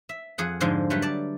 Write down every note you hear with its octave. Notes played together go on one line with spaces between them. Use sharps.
E5
F2 G#4 F#5
G#2 D3 F3 G#3
F#3 G3 A3 B4
D5 A5